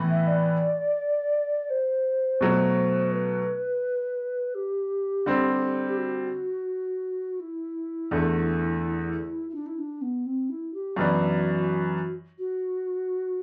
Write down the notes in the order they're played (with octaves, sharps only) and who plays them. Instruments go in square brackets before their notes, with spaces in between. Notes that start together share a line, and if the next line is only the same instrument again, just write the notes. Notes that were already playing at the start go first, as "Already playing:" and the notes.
Already playing: [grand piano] A2 E3 B3
[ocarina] E5
D5
C5
[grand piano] B2 F#3 A3
[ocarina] B4
G4
[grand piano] D3 G3 C4
[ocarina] G4
F#4
E4
[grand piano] E2 D3 A3
[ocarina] E4
D4
E4
D4
B3
C4
E4
G4
[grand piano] F#2 E3 B3 D4 [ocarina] F#4
[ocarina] F#4